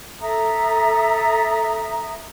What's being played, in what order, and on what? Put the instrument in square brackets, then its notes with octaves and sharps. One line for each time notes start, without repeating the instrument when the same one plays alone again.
[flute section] A4 E5 A#5 D#6